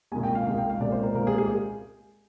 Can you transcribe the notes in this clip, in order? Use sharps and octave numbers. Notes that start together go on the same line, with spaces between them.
C2 A#2 G#3 G#5
G5
F5
C2 A#2 G#3 F5
G5
F5
C2 A#2 G#3 D5
C5
A#4
C2 A#2 G#3 A#4
G#4
G#4